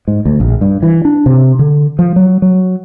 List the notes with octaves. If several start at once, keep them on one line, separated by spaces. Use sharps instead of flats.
G#2
D2
A#1
G2
E3
D4
C3
D3
F3
F#3
F#3